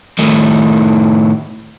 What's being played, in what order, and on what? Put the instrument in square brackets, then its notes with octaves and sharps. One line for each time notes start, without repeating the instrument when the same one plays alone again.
[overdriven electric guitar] A2 D#3